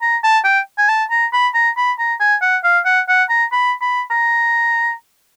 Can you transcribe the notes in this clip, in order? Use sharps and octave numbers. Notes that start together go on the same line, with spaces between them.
A#5
A5
G5
G#5
A5
A#5
B5
A#5
B5
A#5
G#5
F#5
F5
F#5
F#5
A#5
B5
B5
A#5